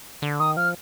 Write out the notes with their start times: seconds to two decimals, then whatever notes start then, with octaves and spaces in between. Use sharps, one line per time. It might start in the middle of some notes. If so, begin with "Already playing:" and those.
0.22 D3
0.39 D#3 D#6
0.57 F3 F6